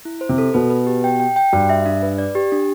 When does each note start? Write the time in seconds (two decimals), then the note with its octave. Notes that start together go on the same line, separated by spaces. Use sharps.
0.05 E4
0.21 C5
0.29 C3
0.38 A4
0.54 B2 B4
0.70 B4
0.87 G4
1.04 G5
1.20 G5
1.36 G5
1.53 G2 F#4
1.69 E5
1.86 D4
2.03 B4
2.18 D5
2.35 G4
2.52 D4